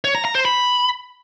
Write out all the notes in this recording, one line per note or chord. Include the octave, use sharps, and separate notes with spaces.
C#5
A#5
A#5
C5
B5